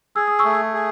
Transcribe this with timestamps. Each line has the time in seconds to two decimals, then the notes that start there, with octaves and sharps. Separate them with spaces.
0.16 G#4 E6
0.27 D#6
0.39 C#6 E6
0.45 A3
0.74 G#4